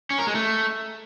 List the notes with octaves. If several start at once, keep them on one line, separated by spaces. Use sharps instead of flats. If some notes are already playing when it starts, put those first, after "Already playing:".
C#4
A#4
G#3
A3